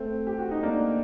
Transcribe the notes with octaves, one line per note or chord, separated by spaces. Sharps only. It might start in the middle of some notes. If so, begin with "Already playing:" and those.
Already playing: A3 C4
G4
F#4
D#4
A#3 D4